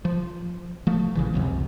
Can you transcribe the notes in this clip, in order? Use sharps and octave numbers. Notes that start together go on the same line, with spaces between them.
F3
F3 A3
A#1 C#3 E3
C#2 F#2 C3